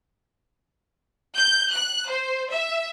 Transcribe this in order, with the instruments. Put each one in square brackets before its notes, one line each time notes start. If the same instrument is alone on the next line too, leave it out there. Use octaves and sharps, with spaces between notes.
[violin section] G6
F#6
C5
E5